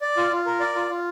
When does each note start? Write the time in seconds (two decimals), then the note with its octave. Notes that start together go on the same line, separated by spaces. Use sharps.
0.01 D5
0.17 F4
0.32 F4
0.46 A#4
0.60 D5
0.75 F4
0.90 F4